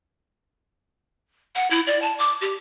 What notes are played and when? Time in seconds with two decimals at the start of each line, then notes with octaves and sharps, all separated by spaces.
1.55 F#5
1.70 E4
1.87 D5
2.02 A5
2.19 D6
2.41 G4